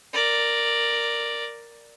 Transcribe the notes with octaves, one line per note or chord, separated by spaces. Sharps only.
A#4 D5